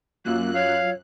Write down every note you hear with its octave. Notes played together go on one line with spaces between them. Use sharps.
F#2 F#3 A#3 F4 E6 F#6
C#5 F5